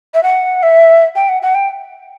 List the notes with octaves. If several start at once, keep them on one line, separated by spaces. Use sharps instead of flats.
E5
F#5
E5
G5
F#5
F#5
G5